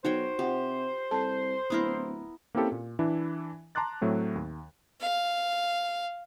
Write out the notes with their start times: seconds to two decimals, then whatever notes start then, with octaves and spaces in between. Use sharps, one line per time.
0.05 B1 D#4 F#4 C5 C#5 G5
0.39 C3 F4 G4 F#5
1.11 C2 A4 A5
1.70 D1 B3 E4 A#4
2.55 A#3 C4 C#4 E4 G4 A4
2.72 A#2
2.99 E3 D4 E4
3.75 A5 A#5 C6 D6 F#6 A6
4.01 A2 F#3 A3 C4
4.35 D#2
5.01 F5